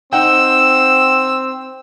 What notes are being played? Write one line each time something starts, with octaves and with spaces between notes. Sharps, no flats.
C4 D#4 F#5 G5 E6